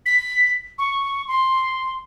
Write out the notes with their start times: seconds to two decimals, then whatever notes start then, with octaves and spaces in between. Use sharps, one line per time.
0.06 B6
0.78 C#6
1.28 C6